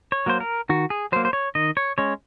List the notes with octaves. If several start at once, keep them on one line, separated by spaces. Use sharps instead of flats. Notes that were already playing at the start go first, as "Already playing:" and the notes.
C#5
F#3 A#3 C5
A#4
D#3 F#4
G#4
F#3 A#3 C5
C5
C#5
D#3 D#5
C#5
G#3 C#4 C#5